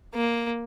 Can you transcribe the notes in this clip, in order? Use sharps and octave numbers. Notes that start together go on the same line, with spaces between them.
A#3